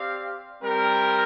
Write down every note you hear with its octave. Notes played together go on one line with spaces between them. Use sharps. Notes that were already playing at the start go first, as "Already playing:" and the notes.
Already playing: C4 G4 D5 F5
G3 C4 A#4 G5